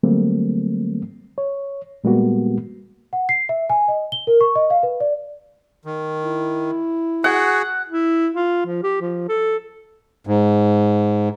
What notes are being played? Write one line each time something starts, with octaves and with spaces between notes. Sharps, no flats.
D3 F#3 G3 A3 A#3 C4
C#5
A#2 G3 G#3 A#3 B3 F#4
F#5
C7
E5
G#5
D#5
G7
A#4
C#6
D#5
F5
B4
D5
D#3
E4
F#4 G#4 F#5
E4
F4
F3
G4
F3
A4
G#2